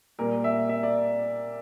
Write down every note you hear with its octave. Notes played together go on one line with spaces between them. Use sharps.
A#2 G3 A#3 A#4
E5
E5
D5